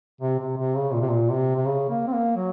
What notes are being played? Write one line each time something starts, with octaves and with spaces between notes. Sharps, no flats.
C3
C3
C3
C#3
A#2
C3
A#2
C3
C3
C#3
A#3
C4
A#3
F#3